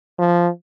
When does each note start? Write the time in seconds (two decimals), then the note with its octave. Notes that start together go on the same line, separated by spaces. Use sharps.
0.19 F3